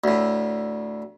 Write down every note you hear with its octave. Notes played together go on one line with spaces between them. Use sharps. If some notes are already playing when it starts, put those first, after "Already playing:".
D2 A2